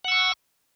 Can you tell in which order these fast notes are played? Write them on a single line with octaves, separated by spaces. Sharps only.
F#5 E6 C#6